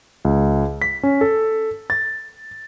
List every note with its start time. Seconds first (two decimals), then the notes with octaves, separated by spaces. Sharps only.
0.25 C#2
0.82 B6
1.03 C#4
1.21 A4
1.90 A6